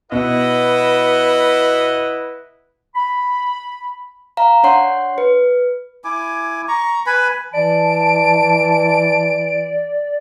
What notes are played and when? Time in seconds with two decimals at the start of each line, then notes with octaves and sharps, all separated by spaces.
0.12 B2 E4 B4 D#5 F#5
2.95 B5
4.37 F5 A#5
4.64 D4 C#5 F#5 C6 C7
5.18 B4
6.04 E4 G#5 D6
6.68 A#5 C#6
7.06 B4 G#5 B5
7.53 E3 D5 A5 D7